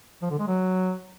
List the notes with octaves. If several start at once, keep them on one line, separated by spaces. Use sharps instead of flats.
F3
D3
G#3
F#3